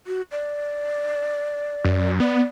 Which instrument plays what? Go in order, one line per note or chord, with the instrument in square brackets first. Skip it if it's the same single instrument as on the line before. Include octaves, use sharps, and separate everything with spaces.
[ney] F#4
D5
[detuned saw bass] F#2
[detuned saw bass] B3 [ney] D5